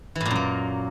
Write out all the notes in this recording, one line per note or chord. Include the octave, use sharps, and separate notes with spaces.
E3
A2
A#2
F#2
A#3